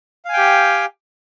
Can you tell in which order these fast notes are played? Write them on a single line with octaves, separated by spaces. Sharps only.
F5 G#5 G5 G4